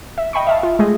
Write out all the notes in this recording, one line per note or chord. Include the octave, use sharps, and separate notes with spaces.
E5
D#5 G5 B5 C#6
E5 F5 A5
F4
G#3 A3 G#4 D#5